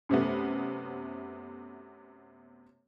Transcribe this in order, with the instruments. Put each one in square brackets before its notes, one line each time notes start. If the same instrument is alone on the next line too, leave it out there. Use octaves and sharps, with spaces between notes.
[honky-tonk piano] F#2 C3 A3 B3